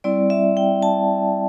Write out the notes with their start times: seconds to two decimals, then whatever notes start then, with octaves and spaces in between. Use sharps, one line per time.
0.04 G3 C4 E4 D5
0.30 E5
0.57 G5
0.82 A5